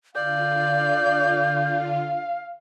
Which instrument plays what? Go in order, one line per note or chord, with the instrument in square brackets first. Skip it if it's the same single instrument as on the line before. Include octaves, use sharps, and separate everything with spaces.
[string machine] D3 F4 [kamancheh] D5 [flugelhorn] F5 [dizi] G6